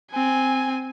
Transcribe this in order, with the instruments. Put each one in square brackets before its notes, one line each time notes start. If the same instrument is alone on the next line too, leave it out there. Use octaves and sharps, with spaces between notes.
[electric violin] C4 G#5